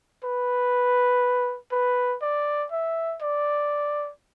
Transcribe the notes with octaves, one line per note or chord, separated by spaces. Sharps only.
B4
B4
D5
E5
D5